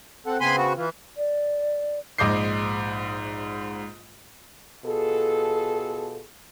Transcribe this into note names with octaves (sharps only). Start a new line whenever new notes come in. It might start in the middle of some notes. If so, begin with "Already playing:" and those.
C4 A4 F#5
C#3 B3 C4 G#5 B5 C6
F#4
E3 F4
D5
A#1 G#2 D#5 D6 G6 C7
B2 F4 G#4 A4